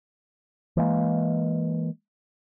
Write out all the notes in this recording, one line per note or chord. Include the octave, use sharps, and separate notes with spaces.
E3 G#3 A#3